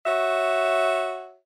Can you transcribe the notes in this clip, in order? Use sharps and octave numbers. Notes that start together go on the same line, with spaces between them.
F#4 C#5 E5